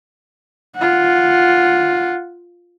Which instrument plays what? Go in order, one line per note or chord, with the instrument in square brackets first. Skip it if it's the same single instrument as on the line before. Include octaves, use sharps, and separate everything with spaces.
[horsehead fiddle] F4 F#5